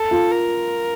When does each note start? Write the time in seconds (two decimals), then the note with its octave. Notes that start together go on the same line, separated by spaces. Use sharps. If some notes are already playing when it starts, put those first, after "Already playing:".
Already playing: A4
0.11 F4
0.32 A#4